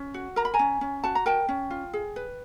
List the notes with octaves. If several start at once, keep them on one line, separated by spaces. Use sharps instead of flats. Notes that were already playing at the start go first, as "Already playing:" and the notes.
Already playing: C#4
F#4
A#4 A#5
B5
G#5 A#5
C#4
C#4
F#4 A5
A#5
A#4 G5 A5
C#4
F4
G#4
B4